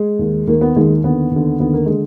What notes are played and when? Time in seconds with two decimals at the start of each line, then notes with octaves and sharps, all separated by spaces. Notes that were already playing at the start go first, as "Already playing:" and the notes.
Already playing: G#3
0.19 D#2 D#3
0.47 D#2 D#3 A#3
0.61 B3
0.76 D#2 D#3 G#3
1.04 D#2 D3 B3
1.31 D#2 D3
1.60 D#2 D3 B3
1.73 A#3
1.86 D3 G#3